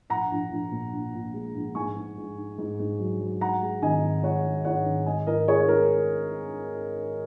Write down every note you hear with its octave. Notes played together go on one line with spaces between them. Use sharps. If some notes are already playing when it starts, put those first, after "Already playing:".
A#1 F#5 A#5
A#1
A#1
A#2
A#1
A#2
G#3
A#1
G#2 G#5 C#6
G#2
G#2
D#4
G#2
G#2
F#3
F#3
G#2 F#5 A#5
G#3
G#1 D#5 G#5
G#2
G#3 C#5 F#5
G#3
G#2 C#5 F#5
G#1
G#3 D#5 G#5
G#2 A#4 D#5
G#3 G#4 C#5
C#5
G#3 A#4